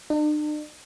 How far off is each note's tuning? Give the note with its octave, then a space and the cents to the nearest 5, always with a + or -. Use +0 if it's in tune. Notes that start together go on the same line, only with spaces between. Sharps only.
D4 +45